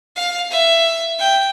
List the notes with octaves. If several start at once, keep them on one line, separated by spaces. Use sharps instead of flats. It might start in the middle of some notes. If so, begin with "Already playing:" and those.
F5
E5
G5